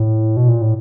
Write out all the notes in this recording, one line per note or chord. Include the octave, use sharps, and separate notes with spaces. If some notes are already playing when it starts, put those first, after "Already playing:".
Already playing: A2
B2
A#2
A2